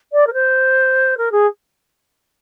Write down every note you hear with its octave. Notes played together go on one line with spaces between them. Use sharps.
D5
A#4
C5
A#4
G#4